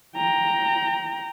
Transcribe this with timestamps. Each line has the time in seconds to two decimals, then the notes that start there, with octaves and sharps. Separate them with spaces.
0.16 G5 A#5